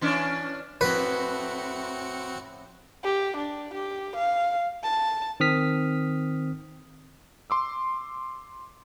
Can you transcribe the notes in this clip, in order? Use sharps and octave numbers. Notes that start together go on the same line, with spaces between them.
E3 C#4 D4
F2 A2 C4 F#4 B4 C#7
G4
D4
G4
F5
A5
D#3 C4 D#6 F6 B6
C6 D6 E6